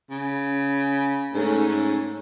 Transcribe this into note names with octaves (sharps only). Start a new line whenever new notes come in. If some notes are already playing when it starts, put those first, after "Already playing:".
C#3
G#2 A3 C#4